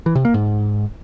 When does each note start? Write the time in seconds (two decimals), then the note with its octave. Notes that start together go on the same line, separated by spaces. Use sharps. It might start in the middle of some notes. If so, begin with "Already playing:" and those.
0.06 E3
0.15 C3
0.25 A#3
0.34 G#2